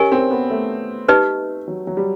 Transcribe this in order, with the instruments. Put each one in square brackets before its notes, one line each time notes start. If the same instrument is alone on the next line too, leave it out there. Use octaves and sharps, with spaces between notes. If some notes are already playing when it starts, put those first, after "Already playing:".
Already playing: [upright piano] C#4 [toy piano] G4 A#4 D#5 G#5 C#6
[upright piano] C4
B3
A3
[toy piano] D#4 G4 B4 D#5
[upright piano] F#3
F#3
G3